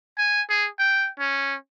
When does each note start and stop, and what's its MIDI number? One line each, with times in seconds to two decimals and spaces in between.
0.18 0.42 80
0.49 0.68 68
0.79 1.09 79
1.19 1.55 61